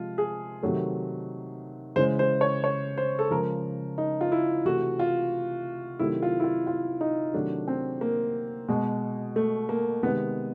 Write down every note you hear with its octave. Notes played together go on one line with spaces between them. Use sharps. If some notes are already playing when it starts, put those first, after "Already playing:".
Already playing: C3 F3 G#3 F4
G#4
C3 D#3 F#3 A3
C#3 E3 G#3 C5
C5
C#5
C#5
C5
A4
C#3 F3 G#3 A#4
D#4
F4
E4
C3 E3 A3 F#4
F4
C3 D#3 F#3 A3 E4
F4
E4
F4
F4
D#4
C3 D#3 F#3 A3 D4
C4
A#3
B2 G#3
A3
A#3
C3 D#3 G#3 B3